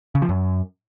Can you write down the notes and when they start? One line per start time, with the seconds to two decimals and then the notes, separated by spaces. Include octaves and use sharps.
0.15 C#3
0.22 F3
0.29 F#2